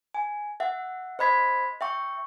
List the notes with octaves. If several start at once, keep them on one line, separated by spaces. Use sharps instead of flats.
G#5
E5 F#5
C5 D#5 B5 G#6 B6
E5 G5 C#6